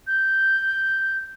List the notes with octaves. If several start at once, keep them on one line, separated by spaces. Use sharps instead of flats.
G6